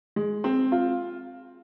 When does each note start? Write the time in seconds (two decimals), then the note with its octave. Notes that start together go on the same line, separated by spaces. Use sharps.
0.16 G#3
0.44 C4
0.72 F4